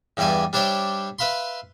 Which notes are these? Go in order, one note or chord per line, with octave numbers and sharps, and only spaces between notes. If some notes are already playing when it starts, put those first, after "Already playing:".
E2 G2 G3 D5 E5 G#5
G3 D4 C5 C#5 E5 G5
B4 E5 F5 B5 C6